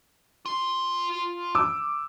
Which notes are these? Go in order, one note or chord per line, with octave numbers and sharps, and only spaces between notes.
F4 C6
D6 E6